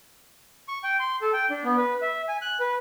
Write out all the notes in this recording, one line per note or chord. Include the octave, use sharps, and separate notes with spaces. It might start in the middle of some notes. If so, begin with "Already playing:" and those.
C#6
G5
C6
A4
G5
D4
B3
B4
E5
G#5
F#6
B4